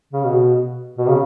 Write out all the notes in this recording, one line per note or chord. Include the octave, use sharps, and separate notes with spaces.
C#3
B2
B2
C#3